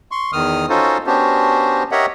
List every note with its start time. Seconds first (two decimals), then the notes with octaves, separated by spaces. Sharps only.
0.11 C6 C#6
0.33 E2 D#3 D#6 F6
0.69 C#4 D#4 F4 F#4 A4 C5
1.07 B3 C#4 D4 F#4 G4 C5
1.91 G4 A#4 C#5 D#5 E5 F#5